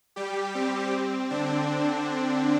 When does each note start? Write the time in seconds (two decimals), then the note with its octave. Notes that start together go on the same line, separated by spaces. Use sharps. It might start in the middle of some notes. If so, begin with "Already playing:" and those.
0.16 G3 G4
0.55 C4
1.30 D3 D4